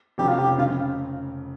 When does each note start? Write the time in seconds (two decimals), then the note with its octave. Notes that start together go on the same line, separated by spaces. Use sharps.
0.18 F1 F2 C#3 F3 G4
0.28 F4
0.38 G4
0.58 C#3 F4